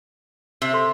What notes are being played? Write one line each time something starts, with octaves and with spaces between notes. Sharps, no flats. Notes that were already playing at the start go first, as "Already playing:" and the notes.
C3
A4 C6